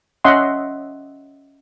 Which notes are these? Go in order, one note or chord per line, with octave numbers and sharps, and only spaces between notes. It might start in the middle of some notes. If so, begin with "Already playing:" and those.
C#4 D#5 E5 F#5 C6